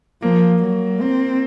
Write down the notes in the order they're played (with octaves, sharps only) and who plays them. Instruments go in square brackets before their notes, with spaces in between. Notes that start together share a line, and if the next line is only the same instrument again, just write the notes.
[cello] F3 [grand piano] A#3
[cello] F#3
[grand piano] A#3 [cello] C4